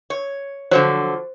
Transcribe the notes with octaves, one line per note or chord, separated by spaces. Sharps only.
C#5
D3 F3 F#3 C5